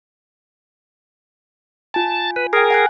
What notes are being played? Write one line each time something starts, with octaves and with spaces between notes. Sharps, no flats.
F4 G#5 A5
B4
G#4 A#4 G5 G#5
F#5 G#5 F#6